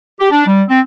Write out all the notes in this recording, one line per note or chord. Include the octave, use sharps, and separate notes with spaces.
G4
D4
G3
C4